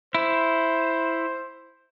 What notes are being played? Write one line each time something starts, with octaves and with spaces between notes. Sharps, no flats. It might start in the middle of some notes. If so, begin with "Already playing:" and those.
E4 C5